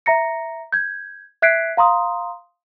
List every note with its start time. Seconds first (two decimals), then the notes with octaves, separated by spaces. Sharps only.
0.06 E5 A#5 A#6 C#7
0.72 G6 G#6
1.42 E5 F#6 G#6 B6 C7 D7
1.77 F5 A#5 C6 D#6